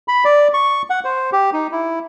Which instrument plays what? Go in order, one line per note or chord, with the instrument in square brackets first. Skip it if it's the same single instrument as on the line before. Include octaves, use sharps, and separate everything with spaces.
[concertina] B5
D5
C#6
F#5
C5
G4
D#4
E4